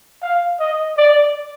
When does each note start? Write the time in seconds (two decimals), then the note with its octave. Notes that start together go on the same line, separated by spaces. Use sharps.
0.23 F5
0.60 D#5
0.98 D5